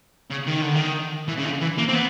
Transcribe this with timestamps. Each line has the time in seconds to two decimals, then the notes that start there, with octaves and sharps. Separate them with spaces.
0.31 C#3
0.47 D#3
0.62 D3
0.75 D#3
1.29 E3
1.39 C#3
1.45 D3
1.62 E3
1.78 A#3
1.88 C4
1.94 B3